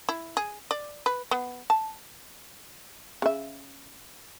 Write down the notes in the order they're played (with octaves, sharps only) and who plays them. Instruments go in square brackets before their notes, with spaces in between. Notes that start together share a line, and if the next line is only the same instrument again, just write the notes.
[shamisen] E4
G#4
D5
B4
B3
A5
C#3 E5